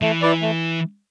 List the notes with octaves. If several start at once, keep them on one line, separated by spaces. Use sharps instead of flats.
E3 A3
E4 B4 D5
A3